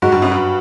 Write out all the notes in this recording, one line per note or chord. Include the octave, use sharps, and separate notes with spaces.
G#2 F#4
G2
F#2
G2 B4